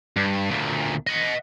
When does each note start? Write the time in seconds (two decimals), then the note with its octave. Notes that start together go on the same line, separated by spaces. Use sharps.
0.16 G2
0.50 D2 A#2
1.07 D#5 F#5